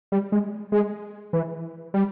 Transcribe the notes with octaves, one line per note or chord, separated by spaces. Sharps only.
G3
G#3
G#3
E3
G3